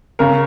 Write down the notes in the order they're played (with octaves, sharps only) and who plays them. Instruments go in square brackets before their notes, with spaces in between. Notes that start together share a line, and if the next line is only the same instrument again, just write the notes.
[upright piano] C#3 A#4